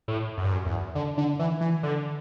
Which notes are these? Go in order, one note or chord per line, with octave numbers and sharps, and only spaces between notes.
A2
F#2
G2
F#2
E2
D3
D3
E3
E3
D3